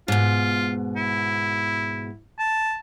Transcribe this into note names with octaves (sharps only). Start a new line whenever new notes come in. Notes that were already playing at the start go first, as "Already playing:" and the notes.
G#2 B2 F4
E4
A5